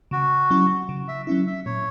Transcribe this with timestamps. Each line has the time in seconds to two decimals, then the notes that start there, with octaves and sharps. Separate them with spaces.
0.11 C#3 F#4
0.50 F#3 C#4 E4
0.89 C#3
1.08 E5
1.27 F#3 C#4 E4 E5
1.47 E5
1.66 A#2 C#5